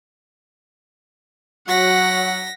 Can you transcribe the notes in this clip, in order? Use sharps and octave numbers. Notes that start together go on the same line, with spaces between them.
F#3 F#4 F#5 A#6 B6